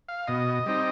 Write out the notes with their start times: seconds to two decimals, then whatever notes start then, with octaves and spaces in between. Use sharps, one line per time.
0.09 F5
0.28 B2 D#5
0.66 G3 C4 D#4